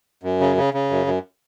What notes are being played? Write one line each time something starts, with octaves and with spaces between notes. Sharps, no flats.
F#2
C#3
C#3
C#3
F#2
F#2